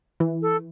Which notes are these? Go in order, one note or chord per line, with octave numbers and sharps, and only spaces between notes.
E3
A4